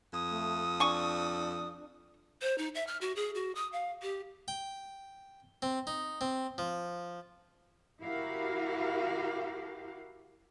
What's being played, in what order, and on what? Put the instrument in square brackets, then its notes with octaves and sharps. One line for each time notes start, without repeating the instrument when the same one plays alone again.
[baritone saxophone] F2 [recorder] D#6
[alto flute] A3
[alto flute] D4 [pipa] G#5 C#6
[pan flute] C5
D#4
E5
F6
F#4
G#4
F#4
D#6
F5
G4
[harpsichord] G5
C4
D#4
C4
F3
[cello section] E4 F#4 G4 A#4 F5